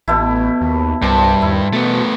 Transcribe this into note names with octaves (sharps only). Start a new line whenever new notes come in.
A1 B2 A3 E4
D#2
C2 G2 C5 A5
D#2 E4
B2 A3 B3